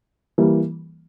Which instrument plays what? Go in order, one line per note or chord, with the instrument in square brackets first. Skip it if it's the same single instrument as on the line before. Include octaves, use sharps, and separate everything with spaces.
[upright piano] E3 G3 A#3